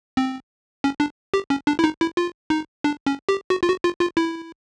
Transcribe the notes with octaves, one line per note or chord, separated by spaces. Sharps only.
C4
C#4
D4
G4
C#4
D4
E4
D#4
E4
F4
D#4
D4
C#4
G4
F#4
F4
F#4
F4
F4
E4